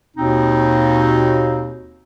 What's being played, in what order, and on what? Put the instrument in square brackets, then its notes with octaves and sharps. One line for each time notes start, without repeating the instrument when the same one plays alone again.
[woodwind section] D#2 B2 C4 D#4